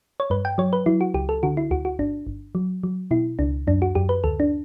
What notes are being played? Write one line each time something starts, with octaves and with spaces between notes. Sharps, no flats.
C#5
G2 B4
G5
F#3 C#5
B4
F#3 E4
F#4
C#2 G4
A4
D3 F#4
E4
D2 F#4
F#4
G1 D4
G1
F#3
F#3
B2 E4
C#2 D4
F#2 D4
F#4
F#2 G4
B4
D2 A4
D4